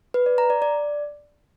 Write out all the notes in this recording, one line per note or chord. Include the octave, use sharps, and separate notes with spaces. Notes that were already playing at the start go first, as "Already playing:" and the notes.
B4
D5
A#5
D5
D5